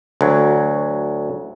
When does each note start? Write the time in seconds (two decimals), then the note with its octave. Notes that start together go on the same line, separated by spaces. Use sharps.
0.21 D2 F#3